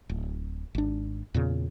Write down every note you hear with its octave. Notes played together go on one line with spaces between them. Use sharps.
D1
G#1 D4
E2 A#2 C#3